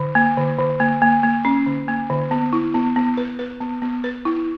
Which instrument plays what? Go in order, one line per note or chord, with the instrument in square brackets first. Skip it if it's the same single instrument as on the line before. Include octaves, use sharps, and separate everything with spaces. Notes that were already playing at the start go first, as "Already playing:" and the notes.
Already playing: [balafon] D3
A#3
D3
D3
A#3
A#3
A#3
C#4
D3
A#3
D3
B3
E4
B3
B3
B4
B4
B3
B3
B4
E4